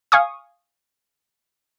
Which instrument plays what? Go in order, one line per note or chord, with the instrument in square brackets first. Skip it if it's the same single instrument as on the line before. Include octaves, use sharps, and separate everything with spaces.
[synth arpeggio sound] F5 G#5 C#6 D#6